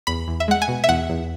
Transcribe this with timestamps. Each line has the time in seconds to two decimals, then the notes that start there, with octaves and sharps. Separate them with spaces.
0.07 E2 B5
0.28 E2
0.40 E5
0.48 G#3 F#5
0.62 G#5
0.68 B2
0.84 E5
0.89 E2 F#5
1.10 E2